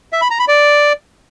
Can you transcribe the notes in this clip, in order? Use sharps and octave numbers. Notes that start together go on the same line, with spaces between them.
E5
B5
A#5
B5
D5